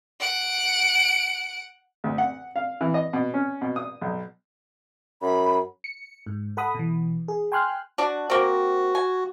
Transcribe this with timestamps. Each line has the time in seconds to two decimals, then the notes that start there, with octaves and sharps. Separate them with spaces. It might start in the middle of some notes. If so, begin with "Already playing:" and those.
0.20 F#5 D7
2.04 D2
2.18 F#5
2.56 F5
2.81 E3
2.94 D#5
3.13 B2
3.34 C#4
3.61 B2
3.76 D#6
4.01 B1
5.22 F#2 B5
5.84 C#7
6.26 G#2
6.57 A4 F#5 B5 D#6
6.75 B2 E3
7.28 G#4
7.52 G5 G#5 C6 F6 F#6
7.98 D4 F#4
8.30 A#3 C4 F#4
8.95 G#5